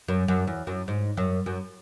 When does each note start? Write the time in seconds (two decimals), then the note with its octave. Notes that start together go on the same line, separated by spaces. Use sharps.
0.08 F#2
0.28 F#2
0.47 E2
0.67 F#2
0.88 G#2
1.17 F#2
1.46 F#2